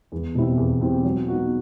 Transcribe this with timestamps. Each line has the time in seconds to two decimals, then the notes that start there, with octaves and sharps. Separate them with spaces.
0.12 E2
0.35 B2 G3 C4 E4
0.58 E2
0.81 B2 G3 C4 E4
1.04 F#3
1.28 B3 D#4 F#4